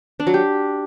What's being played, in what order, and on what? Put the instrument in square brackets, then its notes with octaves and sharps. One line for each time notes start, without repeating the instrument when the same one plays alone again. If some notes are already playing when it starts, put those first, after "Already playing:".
[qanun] D4
F#3
G4